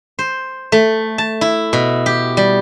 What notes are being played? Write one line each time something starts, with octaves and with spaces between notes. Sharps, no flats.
C5
A3
A5
E4
B2
G4
G3